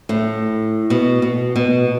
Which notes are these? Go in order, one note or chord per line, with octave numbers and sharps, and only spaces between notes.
A2
B2
B2
B2